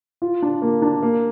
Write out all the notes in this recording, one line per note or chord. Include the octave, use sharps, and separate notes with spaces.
F4
D4
A#3
D4
A#3